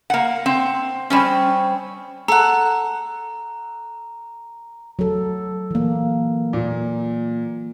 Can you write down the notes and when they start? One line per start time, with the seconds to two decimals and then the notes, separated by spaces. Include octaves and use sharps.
0.10 A#3 F#5
0.46 C4
1.10 G3 C4 C#4
2.28 A4 F#5 A#5
4.99 F#3 A4
5.71 E3 A#3
6.53 A#2